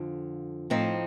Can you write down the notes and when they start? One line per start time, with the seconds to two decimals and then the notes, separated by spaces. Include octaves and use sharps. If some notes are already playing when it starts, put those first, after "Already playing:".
Already playing: F2 D3 F3
0.70 A2 F3 C4 D#4